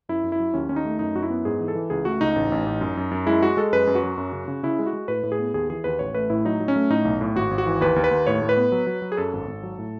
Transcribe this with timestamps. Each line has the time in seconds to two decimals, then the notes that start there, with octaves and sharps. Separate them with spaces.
0.09 F#2 E4
0.24 F#2
0.32 E4
0.40 F#3
0.54 D#2 C#4
0.69 D#2 C#4
0.76 D#4
0.85 A3
0.99 F#2 D#4
1.15 F#2 F#4
1.22 E4
1.30 B3
1.45 G#2 G#4
1.60 E3
1.68 A4
1.75 E3
1.90 C#2 G#4
2.05 A3 F#4
2.21 C#2 D#4
2.36 A1
2.52 A1
2.66 A1
2.81 F#2
2.97 F#2
3.11 F#2
3.26 G#3 E4
3.42 G#3 F#4
3.57 G#3 A4
3.73 F#2 B4
3.87 F#2
3.95 F#4
4.03 F#3
4.18 F#2
4.32 C#3
4.48 C#3
4.63 C#3 E4
4.79 G#3
4.86 F#4
4.93 G#3
5.08 A2 B4
5.23 A2
5.32 G#4
5.39 B3
5.54 D#2 G#4
5.70 E3 G#4
5.84 D#2 B4
5.99 A1 C#5
6.14 A3 B4
6.30 A2 E4
6.45 F#3 D#4
6.60 F#3
6.68 C#4
6.76 A3
6.90 A2 D#4
7.05 B1
7.21 A2
7.35 G#1 F#4
7.51 G#1
7.58 F#4
7.66 E3
7.81 D#2 B4
7.96 D#2
8.04 B4
8.11 D#2
8.27 A2 C#5
8.42 A2
8.49 B4
8.57 B3
8.72 F#3
8.87 F#3
9.02 F#3
9.12 G#4
9.17 F#2 A4
9.33 G#1
9.48 G#1
9.63 F#3
9.79 A2